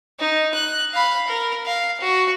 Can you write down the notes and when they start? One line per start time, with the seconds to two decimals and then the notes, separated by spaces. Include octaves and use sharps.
0.19 D#4
0.54 F#6
0.94 F5 B5
1.28 A#4
1.66 F5
2.01 F#4